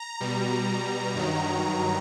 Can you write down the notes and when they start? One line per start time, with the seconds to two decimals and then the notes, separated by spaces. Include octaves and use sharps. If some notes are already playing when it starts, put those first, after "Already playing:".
Already playing: A#5
0.20 B2 G3
1.15 G2 D#3 F#3